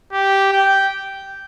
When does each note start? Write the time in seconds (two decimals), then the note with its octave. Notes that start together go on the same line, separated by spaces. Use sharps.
0.13 G4
0.53 G5